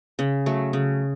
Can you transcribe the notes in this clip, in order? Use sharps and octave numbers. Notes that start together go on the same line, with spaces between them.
C#3
F#3 A3
C#3